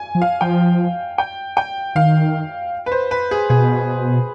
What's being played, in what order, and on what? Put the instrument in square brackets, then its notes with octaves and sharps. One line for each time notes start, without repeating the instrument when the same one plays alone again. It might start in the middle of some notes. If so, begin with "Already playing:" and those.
Already playing: [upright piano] G#5
[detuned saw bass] F3
[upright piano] F5
[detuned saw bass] F3 [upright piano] G5
[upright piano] G5
G5
[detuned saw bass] D#3 [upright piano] F5
[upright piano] B4
C5
B4
G#4
[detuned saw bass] B2 [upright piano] G#4